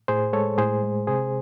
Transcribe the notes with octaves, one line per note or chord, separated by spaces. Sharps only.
A2 G#4 C5
G#3 A4 C#5
A2 G#4 C5
G#3
C3 G#4 C5